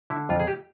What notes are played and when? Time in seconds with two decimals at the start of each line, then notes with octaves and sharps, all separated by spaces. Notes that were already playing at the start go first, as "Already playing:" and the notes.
0.10 D3 E4
0.29 F2 F4
0.40 G#4
0.47 G4